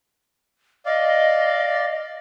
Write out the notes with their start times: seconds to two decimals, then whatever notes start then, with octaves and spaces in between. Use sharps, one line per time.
0.86 D5 D#5 F5